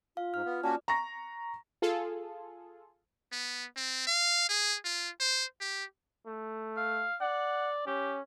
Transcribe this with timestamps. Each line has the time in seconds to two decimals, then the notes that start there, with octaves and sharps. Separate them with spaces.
0.17 F4 F5
0.34 G#2 F6
0.45 B3
0.64 A#3 C#4 F#4 D5 A5
0.88 A#5 C#6 A#6
1.82 F4 G#4 A4
3.32 B3
3.77 C4
4.07 F5
4.49 G#4
4.85 F4
5.20 C5
5.61 G4
6.27 A3
6.77 F5
7.21 D5 F#5
7.86 C#4 G4